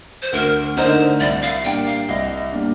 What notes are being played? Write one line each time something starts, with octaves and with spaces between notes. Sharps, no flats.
C5
D2 A#4
D3 A3 D#4 A#4 C5
C2 D5
F5
A#2 G3 A#3 D4 G5
F5
C2 D#5
A#2 G3 A#3 D4